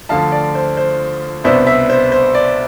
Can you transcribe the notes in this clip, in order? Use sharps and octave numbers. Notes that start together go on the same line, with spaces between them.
D2 D3 F3 F5 A5
D5
C5
C5
C2 B2 B3 D4 C5 E5
C5 E5
C5
C5
D5